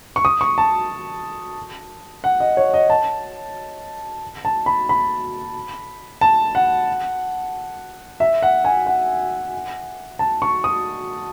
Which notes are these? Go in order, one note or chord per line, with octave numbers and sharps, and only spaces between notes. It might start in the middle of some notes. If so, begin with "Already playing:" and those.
C#6
D#6
C#6
A5
F#5
D#5
C#5
D#5
A5
A5
B5
B5
A5
F#5
E5
F#5
G#5
F#5
A5
C#6
D#6